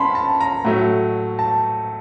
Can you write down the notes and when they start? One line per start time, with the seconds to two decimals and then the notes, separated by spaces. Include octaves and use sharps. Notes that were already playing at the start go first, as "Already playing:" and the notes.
Already playing: C#4 A5 B5 C6
0.15 A5
0.40 A#5
0.65 A2 F#3 A3
1.39 A5